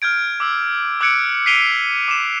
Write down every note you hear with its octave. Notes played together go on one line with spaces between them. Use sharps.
F6 G6 G#6 D7
D6 E6
D6 E6 F#6 G#6 C#7 D7
B6 C7 D7 D#7 F7 G7
D6 E7